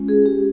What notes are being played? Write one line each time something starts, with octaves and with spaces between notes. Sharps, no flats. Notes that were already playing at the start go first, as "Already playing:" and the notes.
Already playing: G#3 C#4 F4
G#4
G4